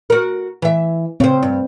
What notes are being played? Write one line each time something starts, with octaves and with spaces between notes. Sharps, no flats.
F#4 A#4
E3 E5
C#3 C4 C5
G2